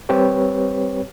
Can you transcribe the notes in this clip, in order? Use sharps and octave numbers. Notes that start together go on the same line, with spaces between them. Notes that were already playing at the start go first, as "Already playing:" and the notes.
G3 C4 G4 B4 C#5